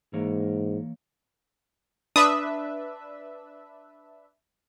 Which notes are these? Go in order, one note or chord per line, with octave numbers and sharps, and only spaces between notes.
G#2 E3 A#3 C#5
D4 B4 E5 D#6